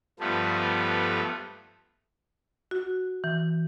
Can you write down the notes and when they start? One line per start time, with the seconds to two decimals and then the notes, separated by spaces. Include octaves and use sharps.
0.20 G2 F3 A3 B3
2.71 F#4
3.24 E3